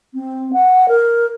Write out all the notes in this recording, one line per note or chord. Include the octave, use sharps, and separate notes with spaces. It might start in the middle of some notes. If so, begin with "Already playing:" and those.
C4
F#5
A#4